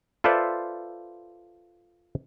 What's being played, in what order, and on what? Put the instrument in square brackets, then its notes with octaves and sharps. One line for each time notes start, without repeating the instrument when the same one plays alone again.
[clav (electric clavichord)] F4 A4 B4 C5 D5 E5